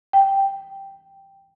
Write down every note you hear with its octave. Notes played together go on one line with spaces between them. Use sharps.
G5